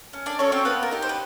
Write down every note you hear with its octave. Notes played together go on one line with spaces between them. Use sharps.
C#4
D4 D5
C#4 F#4 A4 C#5
C4 C5
A#3 B3 B4
A#4
D#4 G4
C5
B4